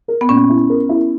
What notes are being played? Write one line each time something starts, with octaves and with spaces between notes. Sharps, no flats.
A#4
B3
A#2 C#4
E4
A#4
E4